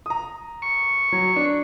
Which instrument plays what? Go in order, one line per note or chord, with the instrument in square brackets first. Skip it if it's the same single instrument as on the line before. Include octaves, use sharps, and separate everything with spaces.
[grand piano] A#5 D#6
[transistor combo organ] C#6
[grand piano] F#3
D4